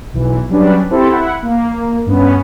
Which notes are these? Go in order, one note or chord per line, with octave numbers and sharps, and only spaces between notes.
B1 E3
F#3 G3 C#4 D4 B4
C4 E4 G4 A4 C5
E4 F#5
A#3
G2 B3 C#4